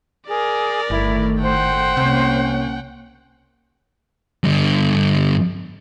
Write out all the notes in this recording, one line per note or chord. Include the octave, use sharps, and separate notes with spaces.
G#4 A#4 D5
G1 A2 D#3 A3 E4
C5 F#5 G5
C2 C3 A#3 C#4
G2 D3